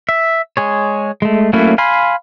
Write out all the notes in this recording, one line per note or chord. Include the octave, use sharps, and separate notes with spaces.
E5
G#3 G#4 C#5
G#3 A3
F#3 A3 A#3 C#4 E4
F5 G#5 B5 C6